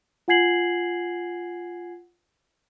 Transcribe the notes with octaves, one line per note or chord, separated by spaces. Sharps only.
F4 F#5 G#5 G#6 C7 F#7